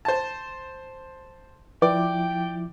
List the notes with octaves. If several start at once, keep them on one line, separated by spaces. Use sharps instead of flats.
C5 A5
F3 E4 B4 D5 G5 D6